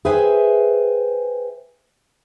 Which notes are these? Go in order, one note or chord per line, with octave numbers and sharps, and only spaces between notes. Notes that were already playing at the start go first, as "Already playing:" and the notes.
G#4 B4 C5 E5 G5 G#5